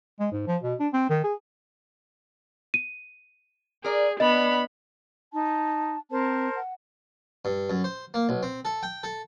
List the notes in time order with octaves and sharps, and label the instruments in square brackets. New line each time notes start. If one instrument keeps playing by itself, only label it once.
[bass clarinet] G#3
G#2
F3
B2
D4
C4
D#3
G#4
[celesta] D#7
[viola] G#4 [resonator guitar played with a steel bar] A#4 D5
[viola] B3 B5 [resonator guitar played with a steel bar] D4 [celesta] D#5
[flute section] D#4 [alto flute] A5
[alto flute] C4 [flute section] A#4 C5 A5
[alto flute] F#5
[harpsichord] G2
F#2
C5
A#3
B1
C4
A4
G5
A4